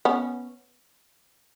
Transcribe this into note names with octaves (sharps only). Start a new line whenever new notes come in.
B3 C#4